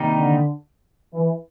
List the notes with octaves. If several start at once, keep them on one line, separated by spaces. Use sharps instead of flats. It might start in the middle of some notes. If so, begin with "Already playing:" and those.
Already playing: C3 D#3 G3 A#3 D#4
D3
E3